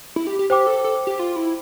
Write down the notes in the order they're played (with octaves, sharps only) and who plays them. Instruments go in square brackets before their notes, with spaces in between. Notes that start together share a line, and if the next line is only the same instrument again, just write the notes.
[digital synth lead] E4
G4
G4
[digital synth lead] G4 [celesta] C5 G5 D6
[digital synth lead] A4
A4
G4
F4
E4